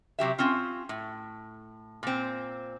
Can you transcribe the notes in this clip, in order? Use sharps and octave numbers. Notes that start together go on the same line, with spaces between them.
C3 F#3 G4 E5
C4 C#4 F4
A2
A#2 C4